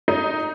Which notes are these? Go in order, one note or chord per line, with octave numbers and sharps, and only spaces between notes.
D#4